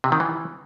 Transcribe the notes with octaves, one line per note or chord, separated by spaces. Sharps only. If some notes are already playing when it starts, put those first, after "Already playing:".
C3
D#3
E3